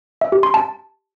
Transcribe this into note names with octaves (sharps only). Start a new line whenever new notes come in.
E5
G4
C6
A5